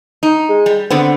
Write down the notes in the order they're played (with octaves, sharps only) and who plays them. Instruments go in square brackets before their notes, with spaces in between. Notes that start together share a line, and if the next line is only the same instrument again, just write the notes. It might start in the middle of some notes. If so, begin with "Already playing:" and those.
[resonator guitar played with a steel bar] D#4
[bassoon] G#3
[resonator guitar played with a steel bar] G3
[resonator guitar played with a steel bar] D3 B3 [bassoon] C4